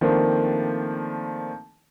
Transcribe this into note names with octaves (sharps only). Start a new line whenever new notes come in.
D#3 F3 A3 A#3 C4 D4